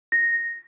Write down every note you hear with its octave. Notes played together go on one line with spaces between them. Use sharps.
A#6